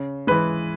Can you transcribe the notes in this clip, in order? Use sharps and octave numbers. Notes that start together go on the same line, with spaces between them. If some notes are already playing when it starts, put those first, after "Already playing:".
Already playing: C#3
E3 G#3 B4